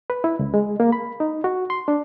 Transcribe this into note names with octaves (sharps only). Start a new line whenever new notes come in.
B4
E4
C#2
G#3
A#3
B5
D#4
F#4
C6
D4